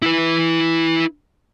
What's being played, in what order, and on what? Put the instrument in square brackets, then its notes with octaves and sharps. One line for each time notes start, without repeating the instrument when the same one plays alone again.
[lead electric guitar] E4 B4